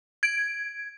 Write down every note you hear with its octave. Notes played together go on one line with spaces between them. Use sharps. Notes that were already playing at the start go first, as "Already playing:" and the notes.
G#6 D7